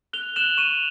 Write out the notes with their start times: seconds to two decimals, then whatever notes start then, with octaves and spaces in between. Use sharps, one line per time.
0.13 F#6 F7 G7
0.36 F#6 E7 F#7
0.57 C#6 D#7 F7